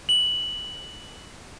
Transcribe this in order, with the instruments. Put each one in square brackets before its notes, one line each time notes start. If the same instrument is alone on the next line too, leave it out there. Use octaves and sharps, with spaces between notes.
[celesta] F#7